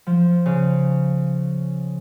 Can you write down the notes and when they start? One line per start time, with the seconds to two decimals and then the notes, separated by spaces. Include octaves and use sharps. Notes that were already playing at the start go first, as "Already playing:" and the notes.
0.07 F3
0.46 C#3